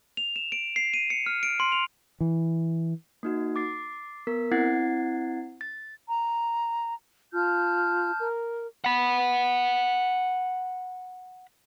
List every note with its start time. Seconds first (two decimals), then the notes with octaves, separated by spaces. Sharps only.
0.17 F7
0.36 E7
0.52 D7
0.76 C7
0.94 D#7
1.10 C#7
1.26 F6
1.43 D7
1.60 C6
1.72 F7
2.21 E3
3.23 A#3 D#4 F#4
3.56 D6 A6 C7
4.27 B3 A#4 B6
4.51 C4 E4 F#5 G#6 A6 C7
5.61 A6
6.08 A#5
7.33 F4 A5 F6 G6
8.20 A#4
8.85 F#5 B5